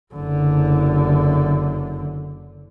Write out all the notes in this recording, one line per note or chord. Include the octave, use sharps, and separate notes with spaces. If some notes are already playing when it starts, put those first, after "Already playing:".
F#1 D3